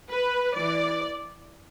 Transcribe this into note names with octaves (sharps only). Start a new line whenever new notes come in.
B4
E3 D5